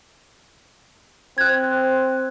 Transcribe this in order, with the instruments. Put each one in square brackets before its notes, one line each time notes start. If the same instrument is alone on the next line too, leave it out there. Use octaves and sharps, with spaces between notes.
[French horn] C4 [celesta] F#6 G#6